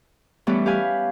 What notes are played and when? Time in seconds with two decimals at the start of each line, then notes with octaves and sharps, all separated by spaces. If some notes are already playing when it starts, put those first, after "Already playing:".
0.47 E3 G3 A3 B3 C#4 E4
0.66 G4 B4 F5 G#5